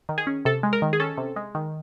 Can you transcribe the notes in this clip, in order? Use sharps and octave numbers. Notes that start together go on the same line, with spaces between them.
D#3
G#4
C#4
C3 A4
G#3
A#4
D#3
G#4
C#4 A4
C3
G#3
D#3